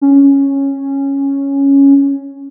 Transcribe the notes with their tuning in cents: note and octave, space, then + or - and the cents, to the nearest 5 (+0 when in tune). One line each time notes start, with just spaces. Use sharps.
C#4 -5